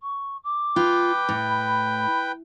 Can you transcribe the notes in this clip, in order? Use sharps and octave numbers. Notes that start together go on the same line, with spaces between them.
C#6
D6
F4 B4 G5
A2
B5